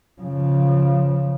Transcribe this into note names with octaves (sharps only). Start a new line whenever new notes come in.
C#3 F3